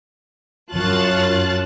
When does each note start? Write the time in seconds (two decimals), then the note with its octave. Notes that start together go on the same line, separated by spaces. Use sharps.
0.72 F#2 F4 C#5 A5 F#6 A6